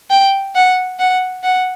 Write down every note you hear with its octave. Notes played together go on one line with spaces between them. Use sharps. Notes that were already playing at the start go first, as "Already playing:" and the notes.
G5
F#5
F#5
F#5